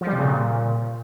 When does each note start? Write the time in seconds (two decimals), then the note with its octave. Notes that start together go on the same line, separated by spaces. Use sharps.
0.01 F3
0.07 G3
0.13 C3
0.18 C#3
0.24 A#2